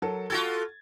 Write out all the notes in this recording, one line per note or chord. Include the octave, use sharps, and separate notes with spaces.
F#3 A4 A#4
F4 F#4 A4 G#6 A6